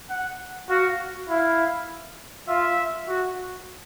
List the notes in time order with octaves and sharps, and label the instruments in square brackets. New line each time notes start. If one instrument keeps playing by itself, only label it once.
[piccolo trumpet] F#5
[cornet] F#4 [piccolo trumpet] F5
[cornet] E4 [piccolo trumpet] F5
[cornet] F4 [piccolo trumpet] E5
[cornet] F#4